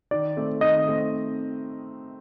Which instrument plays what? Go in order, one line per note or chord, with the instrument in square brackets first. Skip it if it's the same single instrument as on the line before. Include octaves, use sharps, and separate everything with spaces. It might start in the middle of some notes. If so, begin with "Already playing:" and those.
[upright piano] D#3 [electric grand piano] D5
[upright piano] A3 C4
[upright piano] D#3 [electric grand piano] D#5
[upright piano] A3 C4